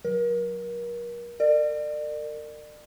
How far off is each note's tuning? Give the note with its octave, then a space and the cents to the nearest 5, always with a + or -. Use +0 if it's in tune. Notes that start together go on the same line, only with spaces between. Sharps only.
F#3 -10 A#4 +35
A#4 -35 D5 +35